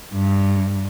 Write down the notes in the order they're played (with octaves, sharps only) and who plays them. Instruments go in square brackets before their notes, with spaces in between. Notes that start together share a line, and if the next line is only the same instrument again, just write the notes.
[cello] G2